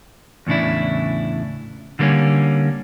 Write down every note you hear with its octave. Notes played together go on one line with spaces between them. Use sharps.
E2 A2 C#3 D4 E4
D3 G3 A#3 C4 C#4